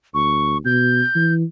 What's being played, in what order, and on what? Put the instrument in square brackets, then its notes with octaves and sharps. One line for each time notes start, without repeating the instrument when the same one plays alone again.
[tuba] D2 [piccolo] C#6
[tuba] B2 [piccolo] G6
[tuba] E3